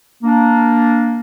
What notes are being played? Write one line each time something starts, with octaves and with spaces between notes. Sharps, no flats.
A#3 D4